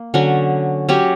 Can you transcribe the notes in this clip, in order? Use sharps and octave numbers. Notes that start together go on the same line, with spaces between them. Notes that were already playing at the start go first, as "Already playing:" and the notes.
Already playing: A#3
D3 F#3 C#4
F#3 C#4 G4